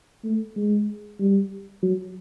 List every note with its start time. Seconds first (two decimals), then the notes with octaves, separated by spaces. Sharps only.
0.24 A3
0.56 G#3
1.20 G3
1.83 F#3